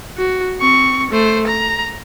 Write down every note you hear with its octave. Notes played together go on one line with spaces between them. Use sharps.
F#4
C4 C#6
A3 C5
A#5